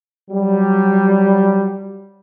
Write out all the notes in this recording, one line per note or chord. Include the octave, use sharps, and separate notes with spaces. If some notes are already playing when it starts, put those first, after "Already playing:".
F#3 G3